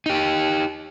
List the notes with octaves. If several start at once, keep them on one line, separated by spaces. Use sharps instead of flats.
D#4 G4